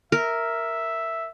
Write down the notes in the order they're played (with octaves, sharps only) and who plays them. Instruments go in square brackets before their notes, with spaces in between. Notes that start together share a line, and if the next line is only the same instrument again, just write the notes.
[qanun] A#4 [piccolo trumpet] E5